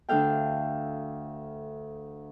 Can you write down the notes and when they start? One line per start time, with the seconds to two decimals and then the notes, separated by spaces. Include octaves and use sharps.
0.09 D2 D4 A4 F5 G5